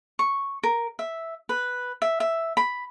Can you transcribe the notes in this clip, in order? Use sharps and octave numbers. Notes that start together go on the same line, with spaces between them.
C#6
A#4
E5
B4
E5
E5
B5